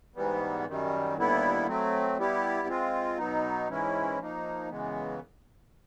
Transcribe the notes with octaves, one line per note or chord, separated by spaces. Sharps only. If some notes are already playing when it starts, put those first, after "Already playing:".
G#2 E3 G3 B3
F#2 D#3 G3
D#2 D3 G3 B3 E4
F#3 A3 C4
G3 B3 E4 G4
G#3 C4 F4
B2 F#3 B3 D#4
G#2 E3 G#3 C#4 E4
F3 A#3 D#4
F#2 C#3 E3 G#3 B3